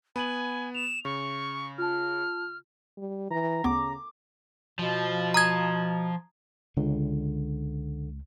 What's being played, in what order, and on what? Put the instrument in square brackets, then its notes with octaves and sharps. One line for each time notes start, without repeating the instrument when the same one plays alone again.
[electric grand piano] B3 [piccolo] G#5 [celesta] B5 D#7 F#7
[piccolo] E7 [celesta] F7
[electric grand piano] C#3 [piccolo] C#6
[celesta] F4 A5 [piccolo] F6
[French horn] G3
[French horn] E3 [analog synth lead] A#5
[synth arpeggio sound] D2 B3 [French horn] C#3 [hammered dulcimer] D6
[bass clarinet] B2 [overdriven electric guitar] F3
[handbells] A#5 D#6 G#6
[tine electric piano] C#2 [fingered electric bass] D3